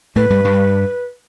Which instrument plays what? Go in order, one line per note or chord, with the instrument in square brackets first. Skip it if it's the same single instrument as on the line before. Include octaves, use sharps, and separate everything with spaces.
[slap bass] A2 A3 [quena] B4
[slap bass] G2 G3
G2 G3